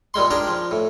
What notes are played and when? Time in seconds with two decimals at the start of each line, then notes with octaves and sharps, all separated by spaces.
0.14 A#2 G3 G#3 C6
0.30 D4 G4 G#4 A#4
0.47 F3
0.71 A2